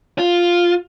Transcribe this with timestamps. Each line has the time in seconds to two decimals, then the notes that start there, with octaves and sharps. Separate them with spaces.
0.19 F4